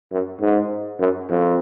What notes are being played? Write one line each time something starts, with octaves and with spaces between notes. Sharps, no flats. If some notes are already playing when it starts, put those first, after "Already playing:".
F#2
G#2
F#2
F2